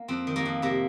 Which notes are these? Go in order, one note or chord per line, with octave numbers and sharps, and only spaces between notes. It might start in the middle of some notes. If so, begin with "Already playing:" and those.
Already playing: A#3
F2 C4
D#3
A#3
F2
C3 A#3